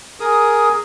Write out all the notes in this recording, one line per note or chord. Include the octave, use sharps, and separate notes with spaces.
G#4 A#4 D#6